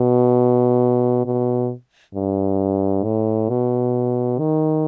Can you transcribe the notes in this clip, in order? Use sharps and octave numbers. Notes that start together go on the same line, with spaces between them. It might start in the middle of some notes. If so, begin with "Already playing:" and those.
Already playing: B2
B2
G2
A2
B2
D#3